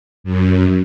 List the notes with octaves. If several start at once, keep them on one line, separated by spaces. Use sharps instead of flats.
F#2